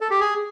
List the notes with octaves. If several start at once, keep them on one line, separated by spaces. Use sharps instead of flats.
A4
G4
G#4